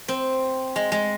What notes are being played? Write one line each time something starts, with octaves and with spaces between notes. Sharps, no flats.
C4
G#3
G#3